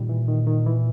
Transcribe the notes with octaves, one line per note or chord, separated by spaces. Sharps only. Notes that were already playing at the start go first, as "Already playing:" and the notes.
Already playing: A#2 D#3 G3
E3
D#3
D#3
E3